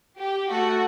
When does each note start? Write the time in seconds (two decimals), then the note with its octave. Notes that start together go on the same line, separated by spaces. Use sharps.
0.18 G4
0.50 A3 F#4